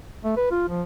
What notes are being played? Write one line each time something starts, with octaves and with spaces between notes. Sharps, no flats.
A3
B4
F4
F3